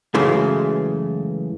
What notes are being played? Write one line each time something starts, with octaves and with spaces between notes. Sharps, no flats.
F#2 C#3 E3 G#3 A3